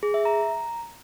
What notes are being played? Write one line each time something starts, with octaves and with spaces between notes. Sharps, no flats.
G#4
E5
A#5